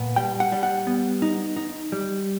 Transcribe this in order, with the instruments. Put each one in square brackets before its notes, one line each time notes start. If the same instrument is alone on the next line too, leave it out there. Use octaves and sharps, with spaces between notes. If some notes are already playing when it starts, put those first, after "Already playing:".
Already playing: [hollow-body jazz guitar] A#2 B3
G3 G5
F#5
G3
F#5
B3
D#4
D#4
G3